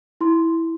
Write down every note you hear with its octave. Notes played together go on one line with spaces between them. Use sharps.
E4 C6